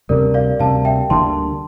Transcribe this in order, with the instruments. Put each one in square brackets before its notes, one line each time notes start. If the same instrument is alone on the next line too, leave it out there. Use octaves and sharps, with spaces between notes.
[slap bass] D2 C3 G3 [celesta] A#4 D5
[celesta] D5 F5
[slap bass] D2 C3 G3 [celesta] F5 A5
[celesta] E5 G5
[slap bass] D2 D3 G3 A#3 [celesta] A5 C6